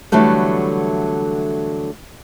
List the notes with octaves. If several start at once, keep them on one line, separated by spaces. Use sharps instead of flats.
D3 E3 F#3 G3 A3